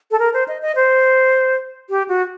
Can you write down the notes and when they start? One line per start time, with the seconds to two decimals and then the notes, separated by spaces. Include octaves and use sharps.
0.11 A4
0.19 A#4
0.34 C5
0.48 D#5
0.62 D#5
0.76 C5
1.90 G4
2.09 F#4